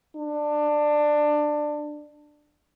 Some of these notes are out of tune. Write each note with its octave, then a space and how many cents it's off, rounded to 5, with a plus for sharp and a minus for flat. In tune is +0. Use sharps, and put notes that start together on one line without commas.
D4 +20